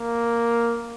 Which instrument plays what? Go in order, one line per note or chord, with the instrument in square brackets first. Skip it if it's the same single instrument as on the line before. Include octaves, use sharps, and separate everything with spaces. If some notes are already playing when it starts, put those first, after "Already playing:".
Already playing: [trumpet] A#3